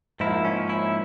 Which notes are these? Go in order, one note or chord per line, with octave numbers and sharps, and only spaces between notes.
G#2 F3 A#3 E4
C#4
E4